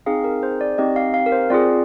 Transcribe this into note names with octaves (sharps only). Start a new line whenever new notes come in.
C4 D#4 G#4 F5
A#4
C5
D5
C4 D#4 G4 D#5
F5
F5
A#4
C5
C4 F4 G#4 D5